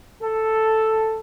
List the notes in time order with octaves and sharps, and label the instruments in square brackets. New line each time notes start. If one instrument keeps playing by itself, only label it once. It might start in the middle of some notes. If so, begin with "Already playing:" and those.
[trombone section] A4